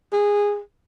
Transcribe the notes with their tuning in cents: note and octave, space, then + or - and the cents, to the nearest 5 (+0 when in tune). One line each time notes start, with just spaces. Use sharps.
G#4 -15